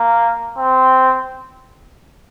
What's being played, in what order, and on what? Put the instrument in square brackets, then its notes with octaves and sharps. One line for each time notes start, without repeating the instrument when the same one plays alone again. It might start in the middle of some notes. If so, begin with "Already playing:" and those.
Already playing: [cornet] A#3
C4